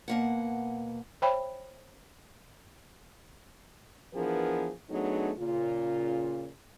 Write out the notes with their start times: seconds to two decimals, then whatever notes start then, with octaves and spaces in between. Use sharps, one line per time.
0.08 B2 A#3 F#5
1.22 C5 C#5 E5 G5 B5
4.14 E3 F3 B3 D4 G#4 A#4
4.89 F#3 A3 B3 D4 D#4 G#4
5.37 A#2 C#3 F4